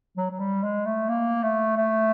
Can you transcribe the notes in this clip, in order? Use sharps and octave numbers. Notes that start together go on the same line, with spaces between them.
F#3
F#3
G3
G#3
A3
A#3
A3
A3